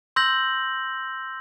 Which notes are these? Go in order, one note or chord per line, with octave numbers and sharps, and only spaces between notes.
C6 E6 G6 A#6 F#7